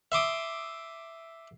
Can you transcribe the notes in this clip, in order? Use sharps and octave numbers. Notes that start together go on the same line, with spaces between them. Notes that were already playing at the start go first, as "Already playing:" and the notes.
E5 C6 D6 D#6